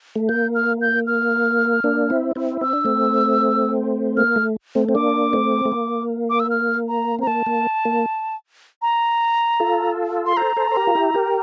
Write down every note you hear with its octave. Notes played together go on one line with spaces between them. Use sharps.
A3
A#3 G6
F6
G6
F6
A#3 D4
C4 E4
C4 E4
C4 E6
D4
A3 C4
A#3 F6
A3
A3 C4
C4
A#3 D4 D6
A3 C4
A3
A#3
D6
E6
F6
A#5
C4 A#5
A#3 A5
A#3
A#3
A#5
F4 A4
C6
A4 C5 A#5
A4 C5
C5
G4 A#4
F4
E4 G4
G4 A#4